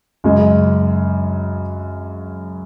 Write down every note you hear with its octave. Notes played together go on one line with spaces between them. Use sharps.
F#2 C#3 G#3